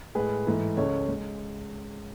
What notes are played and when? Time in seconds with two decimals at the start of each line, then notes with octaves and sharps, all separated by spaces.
0.15 A2 G#3 G#4 B4
0.46 G#2 E3 A3
0.77 C#2 C#3 G#3 A4 C#5
1.08 G#3